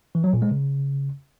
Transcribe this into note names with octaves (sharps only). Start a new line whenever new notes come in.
E3
F#3
A#2
G#3
C#3